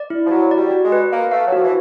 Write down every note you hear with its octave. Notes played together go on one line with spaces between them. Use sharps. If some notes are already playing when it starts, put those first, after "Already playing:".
Already playing: D5
E4
F3
F#3 F#4
D5
G3
F#4
G#3
B4
A#3 F5
A3 F5
F#3
F3 F#4
E3